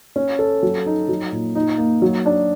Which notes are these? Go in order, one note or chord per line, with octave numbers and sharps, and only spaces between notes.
C#4
A4
F#3
D#4
F#3
A#2
D#4
A#3
F#3
D4